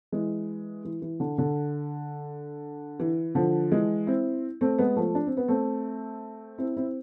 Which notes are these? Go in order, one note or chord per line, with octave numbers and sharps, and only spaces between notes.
E3 G#3
E3
E3
D3
D3
E3
D3 F3
E3 G#3
C4 E4
A3 C4
G#3 B3
F3 A3
D4
C4
B3
A3 C4
C4 E4
C4 E4